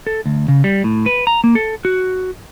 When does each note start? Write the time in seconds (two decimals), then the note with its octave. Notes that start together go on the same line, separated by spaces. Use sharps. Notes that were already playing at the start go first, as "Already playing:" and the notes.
0.07 A4
0.26 D2
0.48 C#3
0.64 G3
0.84 A2
1.06 B4
1.27 A#5
1.44 A#3
1.55 A4
1.85 F#4